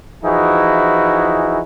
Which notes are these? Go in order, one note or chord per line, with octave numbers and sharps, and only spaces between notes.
E3 F3 D#4 E4 F#4 G#4